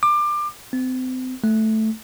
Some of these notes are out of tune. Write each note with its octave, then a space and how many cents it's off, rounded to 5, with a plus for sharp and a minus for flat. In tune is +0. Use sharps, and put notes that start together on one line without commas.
D6 +25
C4 -35
A3 -5